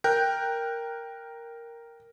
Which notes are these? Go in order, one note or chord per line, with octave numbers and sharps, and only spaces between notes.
A#4 G5 F#6 G6